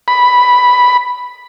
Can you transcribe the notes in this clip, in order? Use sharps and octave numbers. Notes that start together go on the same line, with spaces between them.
B5